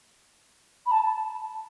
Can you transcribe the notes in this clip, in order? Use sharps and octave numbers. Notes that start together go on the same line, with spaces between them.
B5
A5